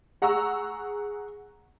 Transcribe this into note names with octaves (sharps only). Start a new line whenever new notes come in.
G#4 F#5 A#5 C#6 E6